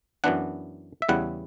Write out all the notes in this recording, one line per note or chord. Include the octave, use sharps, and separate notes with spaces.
F#2 E3 B3 D4 F#5
E5
E2 C#3 G3 B3 E4 F#5